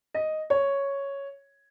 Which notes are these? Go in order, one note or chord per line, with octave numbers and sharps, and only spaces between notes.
D#5
C#5